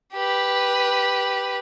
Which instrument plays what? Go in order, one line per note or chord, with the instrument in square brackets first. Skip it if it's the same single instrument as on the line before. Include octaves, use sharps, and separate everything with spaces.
[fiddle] G4 B4